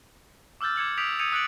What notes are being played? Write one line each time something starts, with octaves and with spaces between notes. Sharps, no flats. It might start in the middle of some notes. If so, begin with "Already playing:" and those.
D6 E6 F6 G6 A6
D6 G#6 C#7 F#7
D#6 G6 B6 D7 F7
D#6 G6 G#6 C#7 D#7 F7
D#6 F#6 A6 C#7 D7 F#7